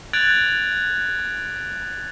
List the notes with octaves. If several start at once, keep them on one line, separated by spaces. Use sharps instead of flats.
F#6 G#6 A6 D7 F7 F#7